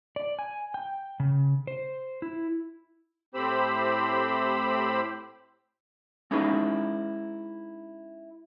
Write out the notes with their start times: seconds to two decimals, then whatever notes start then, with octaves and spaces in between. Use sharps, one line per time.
0.16 D5
0.39 G#5
0.74 G5
1.20 C#3
1.67 C5
2.22 E4
3.34 A2 C4 G4 C5 B5 E6
6.31 G#3 C#4 D#4 E4 G#4 B4